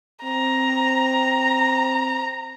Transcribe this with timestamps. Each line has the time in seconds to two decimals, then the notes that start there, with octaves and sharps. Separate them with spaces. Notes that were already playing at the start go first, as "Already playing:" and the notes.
0.24 C4 A#5